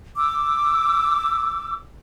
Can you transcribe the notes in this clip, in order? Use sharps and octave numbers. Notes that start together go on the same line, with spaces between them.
D6 E6